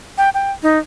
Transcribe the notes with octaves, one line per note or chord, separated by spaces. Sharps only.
G5
G5
D#4